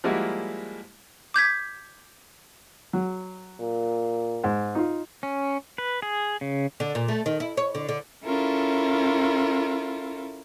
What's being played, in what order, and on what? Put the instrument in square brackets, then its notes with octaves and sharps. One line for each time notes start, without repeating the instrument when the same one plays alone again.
[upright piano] F3 G3 G#3 A#3 E4 F#4
[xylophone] D6 G6 G#6 B6
[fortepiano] F#3
[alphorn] A#2
[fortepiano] G#2
D#4 F4
[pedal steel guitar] C#4
B4
G#4
C#3
[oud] D3
A#2
A3
D#3
E4
C#5
D3
D3
[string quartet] C#4 E4 F4 A4 A#4